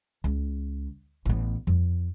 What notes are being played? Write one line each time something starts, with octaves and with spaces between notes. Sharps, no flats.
C#2
A1 B3
F2